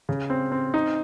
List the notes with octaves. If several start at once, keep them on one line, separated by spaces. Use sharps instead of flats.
C#3
C4
C4
D#4